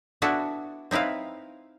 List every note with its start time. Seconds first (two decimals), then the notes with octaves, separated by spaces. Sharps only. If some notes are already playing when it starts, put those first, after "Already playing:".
0.22 B3 D4 E4 F#4 A4
0.91 C4 D#4 E4 B4 F5